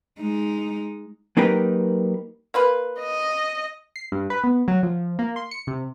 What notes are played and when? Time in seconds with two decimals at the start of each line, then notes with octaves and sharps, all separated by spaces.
0.20 G#3 D#4
1.37 F#3 A#3 D#4 G4 A#4 B4
2.54 A#3 F4 B4
3.00 D#5
3.96 C7
4.12 G2
4.30 B4
4.44 B3
4.68 F#3
4.83 F3
5.19 A#3
5.36 C6
5.51 C#7
5.67 C3